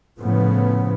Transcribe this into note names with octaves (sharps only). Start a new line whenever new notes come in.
A2 C#3 F3 B3